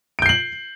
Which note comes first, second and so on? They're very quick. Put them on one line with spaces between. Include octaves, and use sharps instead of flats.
D7 G6 C7 F#7